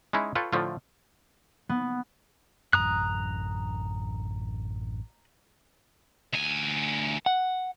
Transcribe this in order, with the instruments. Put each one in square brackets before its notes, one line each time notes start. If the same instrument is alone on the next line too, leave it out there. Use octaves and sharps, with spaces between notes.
[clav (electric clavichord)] G#3 C#4 D#4 E4
F4 A4 B4 C#5 G5
A2 D3 F3 A3 F4
[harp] B3
[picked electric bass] A1 F#2 [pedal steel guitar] A#5 D#6 F#6
[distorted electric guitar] D2 G#5
[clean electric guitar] F#5